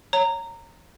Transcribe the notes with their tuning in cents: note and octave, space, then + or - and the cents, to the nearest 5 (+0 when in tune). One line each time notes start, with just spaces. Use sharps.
C#5 +0 A#5 -15